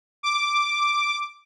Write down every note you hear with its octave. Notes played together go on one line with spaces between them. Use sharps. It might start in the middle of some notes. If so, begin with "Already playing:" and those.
D6